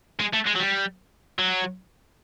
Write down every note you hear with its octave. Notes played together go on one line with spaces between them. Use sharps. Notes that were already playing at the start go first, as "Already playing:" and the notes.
G#3
A3
G#3
F#3
G3
F#3